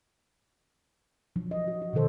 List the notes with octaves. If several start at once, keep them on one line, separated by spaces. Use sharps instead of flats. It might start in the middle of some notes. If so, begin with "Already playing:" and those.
F3 F#3 D4
D#5
F#4
F#4
B2 D3 D#3 A4 C5